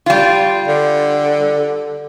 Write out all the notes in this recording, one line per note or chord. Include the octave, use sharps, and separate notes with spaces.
G3 F4
D3